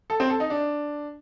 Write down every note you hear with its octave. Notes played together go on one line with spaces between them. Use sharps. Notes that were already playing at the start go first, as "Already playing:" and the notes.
A4
C4
A4
D#4
D4